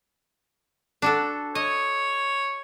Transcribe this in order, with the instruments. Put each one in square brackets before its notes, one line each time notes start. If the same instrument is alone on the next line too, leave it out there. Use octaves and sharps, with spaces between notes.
[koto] D4 F#4 A4
[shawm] C#5 [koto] D#5